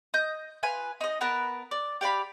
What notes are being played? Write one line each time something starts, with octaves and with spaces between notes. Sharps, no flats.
D#5 G6
F4 B4 G#5
D#4 D#5
B3 A#4 B4 A5
D5
G4 D5 F5 B5